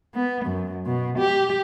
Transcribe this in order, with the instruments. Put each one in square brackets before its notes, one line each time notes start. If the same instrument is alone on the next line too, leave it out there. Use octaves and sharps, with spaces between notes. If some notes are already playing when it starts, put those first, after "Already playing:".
[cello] B3
F#2
B2
G4